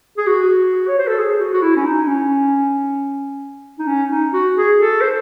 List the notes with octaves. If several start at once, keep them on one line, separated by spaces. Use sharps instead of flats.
G#4
F#4
C#5
C5
A4
G#4
F#4
F#4
E4
C#4
D#4
D#4
C#4
D#4
C#4
D#4
F#4
G#4
A4
C5